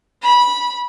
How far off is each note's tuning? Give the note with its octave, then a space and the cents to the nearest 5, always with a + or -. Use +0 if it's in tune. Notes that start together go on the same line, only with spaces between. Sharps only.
B5 -15